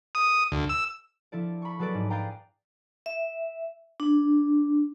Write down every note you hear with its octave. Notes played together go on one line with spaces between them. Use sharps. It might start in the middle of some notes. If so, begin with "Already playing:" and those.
D#6
D2
E6
F3 E4 A4 D5
B5 C#6
F#3 G#4 A4 B4 D5
G#2
G#4 B4 D5 F5 G5 A#5
E5
D4